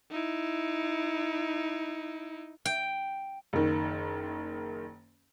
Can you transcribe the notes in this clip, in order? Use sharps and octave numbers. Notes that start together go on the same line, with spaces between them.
D#4 E4
G5
F#1 D#3